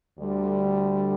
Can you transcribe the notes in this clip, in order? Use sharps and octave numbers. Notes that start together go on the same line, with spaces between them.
D2 D3 G3